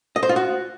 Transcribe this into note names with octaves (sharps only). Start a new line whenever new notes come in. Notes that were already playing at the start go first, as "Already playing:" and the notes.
D#5
C5
F4
F#4